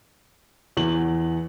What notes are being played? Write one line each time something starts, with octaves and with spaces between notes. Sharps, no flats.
E2 E3 F#7